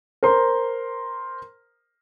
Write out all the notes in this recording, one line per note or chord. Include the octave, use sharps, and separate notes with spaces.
A#4 C5 A#5 C6